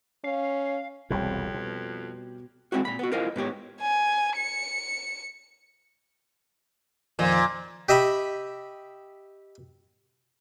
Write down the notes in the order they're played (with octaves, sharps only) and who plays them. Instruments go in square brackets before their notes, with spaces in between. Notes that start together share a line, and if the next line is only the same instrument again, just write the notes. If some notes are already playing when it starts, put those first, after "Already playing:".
[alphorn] C#4 [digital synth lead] F5
[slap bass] E1 C2 B2 [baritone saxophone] F2 [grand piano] G3 C#5 G5
[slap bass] B2
[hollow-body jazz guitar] G#3 A3 C4 E4 F#4
A#2 B5
B3 F#4
E4 F4 A#4 C5 D#5 F5
G#2 B3 G4 C#5
[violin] G#5
C#7
[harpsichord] F2 D#3 C4 [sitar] A#2
[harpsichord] G4 D#5 E5 B5